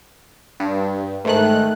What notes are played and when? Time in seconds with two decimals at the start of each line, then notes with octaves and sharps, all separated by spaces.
0.60 G2
1.25 G#2 D#3 A3 F#6